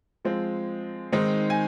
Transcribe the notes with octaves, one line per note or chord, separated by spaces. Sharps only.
F3 G#3 C4
D#3 G#3 C4 D#4
G#5